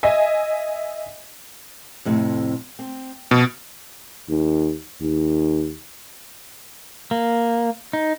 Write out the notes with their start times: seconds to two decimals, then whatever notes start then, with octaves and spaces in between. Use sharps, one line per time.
0.03 D#5 E5 G#5
2.05 F2 A2 C3
2.79 C4
3.31 F2 B2
4.29 D#2
5.02 D#2
7.11 A#3
7.93 D#4